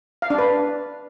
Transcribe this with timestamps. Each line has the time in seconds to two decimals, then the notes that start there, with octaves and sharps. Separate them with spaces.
0.22 F5
0.30 D4
0.38 B4